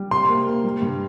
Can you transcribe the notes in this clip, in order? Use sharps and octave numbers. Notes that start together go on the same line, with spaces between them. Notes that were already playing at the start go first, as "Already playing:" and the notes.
Already playing: G3
C3 C6
A#3
A#3
G3
G2